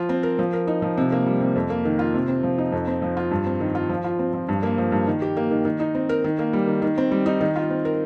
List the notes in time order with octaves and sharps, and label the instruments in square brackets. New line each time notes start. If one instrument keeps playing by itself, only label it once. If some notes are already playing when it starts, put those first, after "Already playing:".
Already playing: [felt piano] F3 F4
C4
A#4
F3
A#4
D#4
F3
C3
A#3
G3
C3
F2
A#3
D#3
F4
C3
C4
F3
D#4
F2
C4
F3
F4
G2
C4
D#3
F4
F3
F4
C4
F3
G2
A#3
F3
G2
D#3
G4
A#3
D#3
D#3
D#4
C4
A#4
D#3
A#3
G3
D#3
D#3
C4
G3
D#4
D#3
F4
C4
A#4